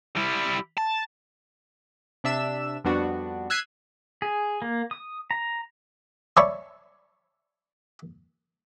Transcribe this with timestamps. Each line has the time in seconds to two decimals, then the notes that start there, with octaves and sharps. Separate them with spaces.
0.17 G3 E4
0.78 A5
2.24 C3 D4 E5 E6 E7
2.84 F2 G3 B3 D4 F#4
3.50 E6 F#6 G#6 B6 C7 D#7
4.22 G#4
4.62 A#3
4.91 D#6
5.31 A#5
6.37 C#5 D5 E5 A5 B5 C#6